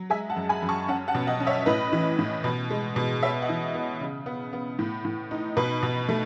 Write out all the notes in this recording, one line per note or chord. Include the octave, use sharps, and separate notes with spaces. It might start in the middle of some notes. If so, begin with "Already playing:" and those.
Already playing: F#3
G#3 E5 G#5
F#5 A5
F#2
G#5 B5
F#2
A5 C#6
C#4 F#5 A5
F#5 A5
B2
D#5 F#5
C#4
C#5 E5
A2 B4 D#5
E3
A2
B2
G#3
B2
B3 C#5 E5
D#5 F#5
E3
B3
C#3
B3
B3
A2
A2
D#4
B2 B4
B2
A3